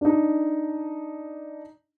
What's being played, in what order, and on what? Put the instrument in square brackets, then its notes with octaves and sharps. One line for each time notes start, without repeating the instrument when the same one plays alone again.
[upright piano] D4 D#4